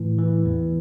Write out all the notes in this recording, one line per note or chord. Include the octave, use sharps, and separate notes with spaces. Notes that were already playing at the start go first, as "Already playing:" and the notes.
Already playing: A2 E3
E3
E2